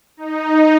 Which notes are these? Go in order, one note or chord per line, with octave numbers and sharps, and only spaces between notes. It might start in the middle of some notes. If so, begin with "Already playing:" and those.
D#4